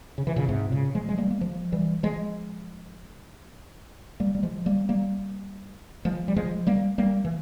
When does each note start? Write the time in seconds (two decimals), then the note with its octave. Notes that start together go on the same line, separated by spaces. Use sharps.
0.18 C#3
0.27 E3
0.36 A#2 C#3
0.49 G#2 C3
0.72 A#2 C#3
0.95 F3 G#3
1.09 G#3
1.18 G3 A#3
1.31 A#3
1.41 F3 G#3
1.72 E3 G3
2.03 F3 G#3
4.20 G3 A#3
4.35 G3
4.43 F3 G#3
4.66 G3 A#3
4.89 G3 A#3
6.05 F3 G#3
6.28 G3
6.36 F3 G#3
6.67 G3 A#3
6.98 G3 A#3
7.25 E3